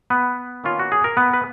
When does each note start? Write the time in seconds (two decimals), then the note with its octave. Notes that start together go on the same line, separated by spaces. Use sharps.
0.10 B3 B4
0.64 D#3 A#3 C#4 F4
0.79 F#4
0.92 G#4
1.04 A#4
1.17 B3 B4
1.33 B4